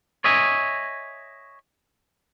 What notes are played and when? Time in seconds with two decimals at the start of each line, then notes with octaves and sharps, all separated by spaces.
0.24 C#5 D#5 E5 G#5